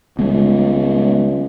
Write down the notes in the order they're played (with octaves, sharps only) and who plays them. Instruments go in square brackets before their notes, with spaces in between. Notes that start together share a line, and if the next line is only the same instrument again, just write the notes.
[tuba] C#2 [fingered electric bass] G3 G#3 B3